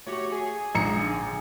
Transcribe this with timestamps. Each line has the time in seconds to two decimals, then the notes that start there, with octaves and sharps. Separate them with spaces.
0.07 A3 F#4 G4 C#5
0.32 G#4
0.75 A#1 G#3 D#4 A#5 C#7
0.97 D3 G#5